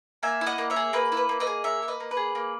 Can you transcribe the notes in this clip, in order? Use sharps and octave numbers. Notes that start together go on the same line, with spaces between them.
A#3 E5 G#5
E4
D#5 F#5
A#3
C#5 E5
G#4
A#3 B4
E4
B4
A#3
B4 D#5
G#4
A#3 C#5 E5
E4
B4 D#5
A#3
B4
G#4
A#3